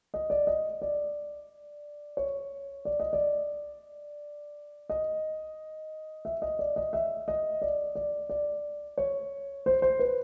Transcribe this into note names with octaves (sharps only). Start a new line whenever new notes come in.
D#5
D5
D#5
D5
C#5
D5
D#5
D5
D#5
E5
D#5
D5
D#5
E5
D#5
D5
D5
D5
C#5
C5
C5
B4